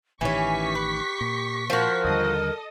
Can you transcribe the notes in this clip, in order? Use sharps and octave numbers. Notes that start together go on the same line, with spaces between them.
A1 D#3 E3 C#4 G4 C#6 B6
B4
A#2
F3 F#4 A#4
D#2 D3 G3 A4 D#5 D#6